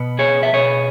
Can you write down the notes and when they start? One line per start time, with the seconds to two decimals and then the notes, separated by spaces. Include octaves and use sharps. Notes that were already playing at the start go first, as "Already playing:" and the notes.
Already playing: B2 B3
0.19 G#4 C#5
0.43 E5
0.53 B2 B3 G#4 C#5